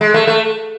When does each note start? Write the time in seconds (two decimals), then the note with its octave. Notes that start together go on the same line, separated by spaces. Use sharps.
0.01 G#3
0.14 A3
0.27 A3